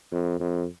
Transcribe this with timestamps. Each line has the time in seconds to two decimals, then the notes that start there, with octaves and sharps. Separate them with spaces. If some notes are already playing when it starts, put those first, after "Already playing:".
0.12 F2
0.40 F2